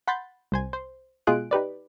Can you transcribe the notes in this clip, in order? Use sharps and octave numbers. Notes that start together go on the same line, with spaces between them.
F#5 B5 C6 G6 A6
C2 C5 G#5
C5
B2 G#3 F4 G#4 F#6 D7
D#4 G4 B4 D5